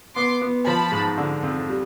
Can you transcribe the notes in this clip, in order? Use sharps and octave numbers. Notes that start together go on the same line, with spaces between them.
B3 C6 D6
B3
F3 A5 B5
G#2
D3
F2
G3